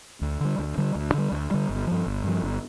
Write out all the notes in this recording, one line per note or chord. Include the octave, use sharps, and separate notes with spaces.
D2
D3 G3
D2
D3 G3
D2
D3 G3
D2
D3 G3
G1
G2 F3
G1
G2 F3
G1